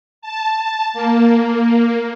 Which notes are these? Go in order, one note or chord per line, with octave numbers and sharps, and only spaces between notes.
A5
A#3